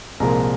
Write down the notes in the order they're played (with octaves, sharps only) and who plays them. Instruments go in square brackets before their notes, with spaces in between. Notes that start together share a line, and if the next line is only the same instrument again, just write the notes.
[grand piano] C2 A#2 F3 G#3 A#4 A#5